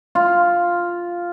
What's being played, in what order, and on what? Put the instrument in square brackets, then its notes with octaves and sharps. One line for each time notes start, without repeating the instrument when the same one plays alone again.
[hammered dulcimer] F4